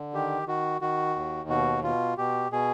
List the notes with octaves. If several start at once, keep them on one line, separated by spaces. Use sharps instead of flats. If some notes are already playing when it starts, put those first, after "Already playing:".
Already playing: D3
D#3 G4
D#3 F#4
D#3 F#4
D#2
B2 F#4
B2 F4
B2 G4
B2 G#4